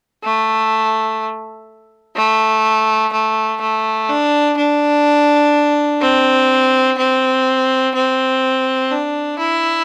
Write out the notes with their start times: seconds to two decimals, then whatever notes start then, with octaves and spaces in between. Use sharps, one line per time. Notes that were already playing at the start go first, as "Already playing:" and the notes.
0.24 A3
2.16 A3
3.13 A3
3.61 A3
4.09 D4
4.57 D4
6.01 C4
6.98 C4
7.94 C4
8.91 D4
9.39 E4